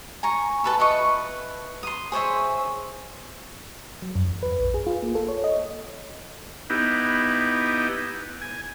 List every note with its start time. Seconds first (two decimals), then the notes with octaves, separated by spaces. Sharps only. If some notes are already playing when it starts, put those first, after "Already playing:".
0.23 G#5 A#5 C#6
0.64 A4 B4 E5
0.79 E4 B4 D#5 C#6
1.83 C6 D#6
2.12 G#4 C5 C#5 E5
4.02 F#3
4.15 F#2
4.27 E2
4.43 B4
4.59 A#1
4.74 G#4
4.87 F4
5.03 A#3
5.15 A4
5.28 C#5
5.44 D#5
6.70 B3 D#4 E4 G4
8.42 G#5